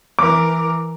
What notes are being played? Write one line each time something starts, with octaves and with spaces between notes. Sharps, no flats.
E3 A#4 D6